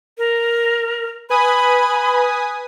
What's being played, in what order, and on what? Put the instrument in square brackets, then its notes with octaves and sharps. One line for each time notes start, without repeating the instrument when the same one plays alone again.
[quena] A#4
[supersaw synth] B4 G#5 D#6 [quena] B5